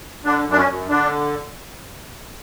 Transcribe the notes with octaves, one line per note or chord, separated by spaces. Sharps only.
D3 D4
F#2 D4
C#4
F#2
D3 D4